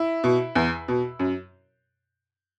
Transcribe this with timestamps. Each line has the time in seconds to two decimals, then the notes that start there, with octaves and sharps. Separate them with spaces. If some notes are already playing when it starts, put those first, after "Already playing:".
Already playing: E4
0.24 B2
0.55 E2
0.88 B2
1.19 F#2